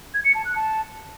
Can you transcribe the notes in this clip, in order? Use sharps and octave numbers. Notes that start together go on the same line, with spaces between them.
G#6
C#7
A5
F#6
A5